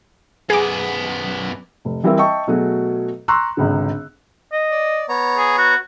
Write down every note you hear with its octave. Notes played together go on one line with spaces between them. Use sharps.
F#2 B3 G#4 D6
F1
E3 G3 C4 E4 A#4 E5
D#5 E5 G5 A5 C#6
B2 F#3 A3 F#4 G#4
A#5 C6 C#6 E6 F#6
G#1 C#2 D3
D#5
D5
B3 C#5 A#5
G#4
F#4